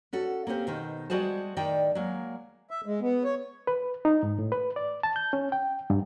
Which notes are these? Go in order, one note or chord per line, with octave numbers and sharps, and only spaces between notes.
C#4 F#4 A4
A#3 C4 C#4 G4 C5
B2 D#3 C5
G3 G#3 F#4 G#4 C5 A5
A2 D#3 D5 D#5 G5
F#3 G#3 A#3
E5
G#3
B3
C#5
B4
D#4
G#2
A2
B4
D5
A5
G6
C#4
G5
G2